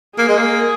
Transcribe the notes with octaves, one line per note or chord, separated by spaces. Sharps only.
A#3 G#4
G#3
A#3